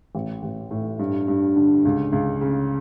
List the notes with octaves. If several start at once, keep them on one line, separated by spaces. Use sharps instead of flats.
A1
A1
A2
G2
G2
D3
C#2
C#2
C#3